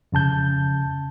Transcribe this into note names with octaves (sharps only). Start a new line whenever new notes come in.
F2 C#3 A5 G6